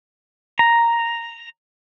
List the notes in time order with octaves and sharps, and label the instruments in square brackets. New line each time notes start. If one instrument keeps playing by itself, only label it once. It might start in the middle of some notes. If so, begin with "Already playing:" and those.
[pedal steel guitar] A#5